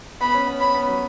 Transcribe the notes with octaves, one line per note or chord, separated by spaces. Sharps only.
B3 B5
C#4
B3
C#4 B5
B3
F#3